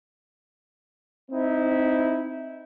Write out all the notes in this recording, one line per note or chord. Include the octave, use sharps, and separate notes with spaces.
C4 D#4 E4